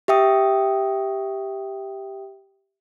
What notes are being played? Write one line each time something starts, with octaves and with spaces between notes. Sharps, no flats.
G4 E5 G5 D#6